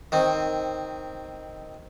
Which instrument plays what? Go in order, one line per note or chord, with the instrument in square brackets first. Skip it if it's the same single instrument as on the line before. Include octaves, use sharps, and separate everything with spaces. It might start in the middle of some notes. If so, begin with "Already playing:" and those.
[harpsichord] D#3 C4